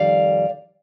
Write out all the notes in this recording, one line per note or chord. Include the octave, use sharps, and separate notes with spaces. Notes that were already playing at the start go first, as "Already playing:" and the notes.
Already playing: F2 D#3 G3 D5 F5